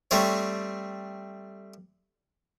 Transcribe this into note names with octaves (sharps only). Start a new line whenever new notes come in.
G3 A3 C4 C#5